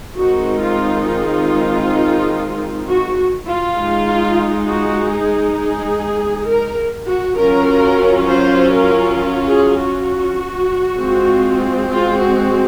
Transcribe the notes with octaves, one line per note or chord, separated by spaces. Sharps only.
D#3 G#3 C4 D#4 F#4
F4
F4
F#4
F4
G#3 D#4
F#4
G#4
G#4
A#4
F#4
F#3 C#4 F4 A#4
C5
A#4
G#4
F#4
G#3 C4 F4
F4
F#4